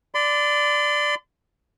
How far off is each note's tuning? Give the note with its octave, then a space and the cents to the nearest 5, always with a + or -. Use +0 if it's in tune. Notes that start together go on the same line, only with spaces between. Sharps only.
D5 +0 C6 -40